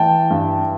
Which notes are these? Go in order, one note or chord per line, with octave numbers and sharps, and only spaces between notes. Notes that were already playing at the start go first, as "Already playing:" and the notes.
Already playing: E3 G5 A5
G2